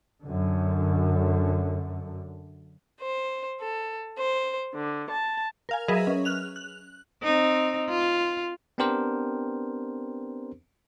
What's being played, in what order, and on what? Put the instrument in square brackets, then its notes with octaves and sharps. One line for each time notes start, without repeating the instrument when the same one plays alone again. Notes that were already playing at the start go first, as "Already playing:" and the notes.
[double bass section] F#2 D3
[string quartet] C5
A4
C5
D3
A5
[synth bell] A#4 F5 G#5
F#3 G#4 A#4 B4 D#5 E5
C#4
F6 F#6 F7
F#6
[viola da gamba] C4 D#4
F4
[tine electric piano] B3 C4 D4 G4 A#4 C5